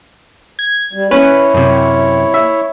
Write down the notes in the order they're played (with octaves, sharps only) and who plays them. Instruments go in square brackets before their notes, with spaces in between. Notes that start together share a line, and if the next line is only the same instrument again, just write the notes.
[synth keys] G#6
[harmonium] G3
[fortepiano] C#4 [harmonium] E4 C#5 [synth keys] B4
[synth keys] F#2 C3
[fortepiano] E5